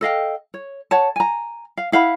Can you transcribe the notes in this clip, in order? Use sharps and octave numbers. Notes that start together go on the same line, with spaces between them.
A4 D#5 F5 G5
C#5
C#5 F#5 A5
G#5 A#5
F5
E4 F5 F#5 B5